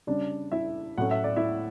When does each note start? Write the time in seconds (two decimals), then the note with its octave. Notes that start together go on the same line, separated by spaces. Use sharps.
0.07 C#3 G3 C#4 D4 D5
0.52 E4 E5
0.98 A2 F#3 A3 C#4 F#5
1.11 E5
1.24 D5
1.36 E4 E5